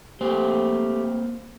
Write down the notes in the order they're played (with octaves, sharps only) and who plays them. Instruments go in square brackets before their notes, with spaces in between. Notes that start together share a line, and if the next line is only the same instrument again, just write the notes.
[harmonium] A3 G4 [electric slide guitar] A#3 C4 C5